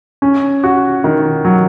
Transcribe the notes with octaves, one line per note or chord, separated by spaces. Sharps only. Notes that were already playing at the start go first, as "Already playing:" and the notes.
C#4
F#4
D#3
F#3